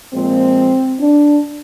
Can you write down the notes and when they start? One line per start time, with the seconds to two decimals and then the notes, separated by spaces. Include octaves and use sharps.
0.13 A#2 F3 G#3 C4
1.00 D4